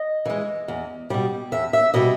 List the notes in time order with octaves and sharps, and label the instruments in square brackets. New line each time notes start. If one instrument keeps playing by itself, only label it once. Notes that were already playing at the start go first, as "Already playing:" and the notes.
Already playing: [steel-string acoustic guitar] D#5
E3 G#3
E2
B2 G3
E2 E5
E5
B2 G3 D#5